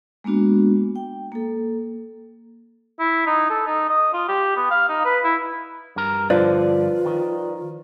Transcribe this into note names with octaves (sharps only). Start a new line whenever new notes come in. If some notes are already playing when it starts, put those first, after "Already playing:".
G#3 A#3 B3 D4 F#4
G5
A#3 A4
E4
D#4
A4
D#4
D#5
F4
G4
B3
F5
D#4
B4
E4
G2 A#4
G2 D3 F3 F4 B4 D5
D#3